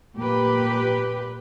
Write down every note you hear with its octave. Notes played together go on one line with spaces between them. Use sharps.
A#2 G4 B4